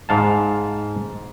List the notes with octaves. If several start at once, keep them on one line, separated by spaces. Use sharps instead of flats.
G#2 F5 A5